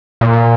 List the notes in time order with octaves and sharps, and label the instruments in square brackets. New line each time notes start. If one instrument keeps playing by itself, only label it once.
[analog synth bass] A#2